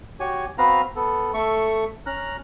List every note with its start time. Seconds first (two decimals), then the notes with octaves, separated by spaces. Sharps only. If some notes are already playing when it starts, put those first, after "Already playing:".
0.20 F#4 G4 C#5 G#5
0.58 B3 C4 F#4 B4 F5 A#5
0.96 B3 A4
1.34 A3 A4 E5 C#6
2.06 C#4 A#5 F6 F#6